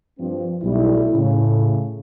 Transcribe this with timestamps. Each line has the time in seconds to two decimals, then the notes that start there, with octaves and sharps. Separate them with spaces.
0.19 G2 F3 C4
0.63 B1 G3 A3 E4
1.14 A2 C#3